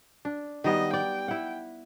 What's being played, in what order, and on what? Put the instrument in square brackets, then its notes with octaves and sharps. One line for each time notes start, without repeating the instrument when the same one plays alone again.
[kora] D4
[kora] D#3 G3 B3 [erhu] D#5
[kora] D5 [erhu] G5
[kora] E4 F#5